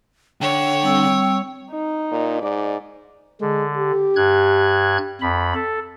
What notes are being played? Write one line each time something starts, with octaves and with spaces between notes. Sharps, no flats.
D3 C#5 G5
G3 C4 E6
D#4
A#2
G#2 D5
D3 G#3
G4
G2 F#6 G#6
F2 B5
A4